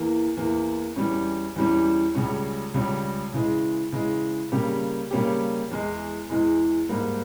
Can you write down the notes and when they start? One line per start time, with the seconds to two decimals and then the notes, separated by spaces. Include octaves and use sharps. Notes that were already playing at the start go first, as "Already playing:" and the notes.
Already playing: E2 E3 A#3
0.37 E2 E3 A#3
0.96 E2 E3 G3 C#4
1.56 E2 E3 G3 C#4
2.15 C#2 C#3 G3 C#4
2.74 C#2 C#3 G3 C#4
3.34 C#3 E3 G#3
3.92 C#3 E3 G#3
4.52 C#3 G3 A#3 C#4 G4
5.11 C#3 G3 A#3 C#4 G4
5.71 E2 E3 G#3
6.30 E2 E3 G#3
6.89 G#2 G3 A#3